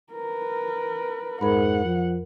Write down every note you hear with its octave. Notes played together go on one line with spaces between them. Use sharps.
A#4 B4
F2 G#2 A#4 F#5 B5
F3